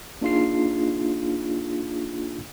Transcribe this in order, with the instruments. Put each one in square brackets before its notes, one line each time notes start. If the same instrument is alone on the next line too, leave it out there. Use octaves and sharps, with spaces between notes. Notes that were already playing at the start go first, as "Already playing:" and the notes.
[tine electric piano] A#3 D4 D#4 F4 G#4 C7